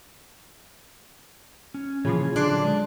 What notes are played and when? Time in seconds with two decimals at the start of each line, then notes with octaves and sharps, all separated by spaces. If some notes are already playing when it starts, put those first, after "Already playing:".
1.74 C#4
2.05 A#2 C#3 E3 F3 F4 G#4 C#5
2.36 D3 F#3 D4 C6 D6 F#6
2.48 D5
2.65 G#3